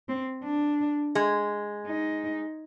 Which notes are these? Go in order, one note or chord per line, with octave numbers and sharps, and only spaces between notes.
C4
D4
G#3
D#4